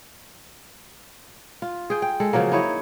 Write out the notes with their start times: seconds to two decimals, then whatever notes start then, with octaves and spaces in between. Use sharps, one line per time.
1.62 F4
1.90 G#4 G5
2.02 G5
2.20 G#3 A4
2.33 C#3 F3 F#3 A#3
2.52 D#4 E4 C#5